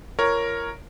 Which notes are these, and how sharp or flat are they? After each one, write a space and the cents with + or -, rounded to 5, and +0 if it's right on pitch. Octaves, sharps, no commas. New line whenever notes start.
F4 -45 A#4 +0 C#5 +0